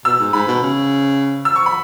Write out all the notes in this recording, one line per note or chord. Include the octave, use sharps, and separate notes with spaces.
B2 E6
G#2
G#2 B5
B2
C#3
E6
C#6
B5